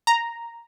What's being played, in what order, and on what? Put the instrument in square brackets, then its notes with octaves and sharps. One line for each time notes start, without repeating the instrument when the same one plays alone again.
[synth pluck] A#5